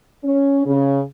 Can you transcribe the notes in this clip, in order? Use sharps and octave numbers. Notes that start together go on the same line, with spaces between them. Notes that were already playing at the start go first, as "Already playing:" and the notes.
C#4
C#3